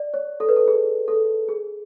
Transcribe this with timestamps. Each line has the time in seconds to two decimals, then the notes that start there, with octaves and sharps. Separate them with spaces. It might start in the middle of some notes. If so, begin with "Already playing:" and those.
Already playing: D5
0.14 C#5
0.40 A4
0.49 B4
0.56 A4
0.68 G#4
1.08 A4
1.49 G#4